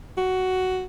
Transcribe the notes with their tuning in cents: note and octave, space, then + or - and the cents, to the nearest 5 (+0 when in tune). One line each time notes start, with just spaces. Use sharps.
F#4 +10